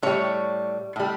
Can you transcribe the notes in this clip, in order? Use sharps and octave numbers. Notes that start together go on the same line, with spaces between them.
A2 G3 C#5
A2 G3